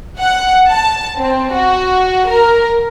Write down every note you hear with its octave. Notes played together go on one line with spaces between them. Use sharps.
F#5
A5
C4
F#4
A#4